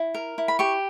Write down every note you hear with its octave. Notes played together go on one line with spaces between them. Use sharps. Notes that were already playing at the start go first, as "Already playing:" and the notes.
Already playing: E4
A#4
E4
B5
G4 C#6